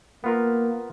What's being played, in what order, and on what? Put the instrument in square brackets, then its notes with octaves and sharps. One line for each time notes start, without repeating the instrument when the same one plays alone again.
[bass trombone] A#3 [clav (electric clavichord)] B3 F4 A#4